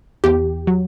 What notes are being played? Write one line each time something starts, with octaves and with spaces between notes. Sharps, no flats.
E2 G4
F#3